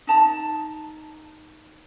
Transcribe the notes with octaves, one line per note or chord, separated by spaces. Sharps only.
D#4 A5 A#5